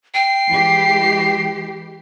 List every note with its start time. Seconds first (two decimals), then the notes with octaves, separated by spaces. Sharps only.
0.14 G5 C7
0.50 E3 G#3 G4